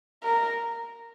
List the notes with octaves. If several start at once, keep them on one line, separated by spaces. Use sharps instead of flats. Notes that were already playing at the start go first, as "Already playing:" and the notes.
A#4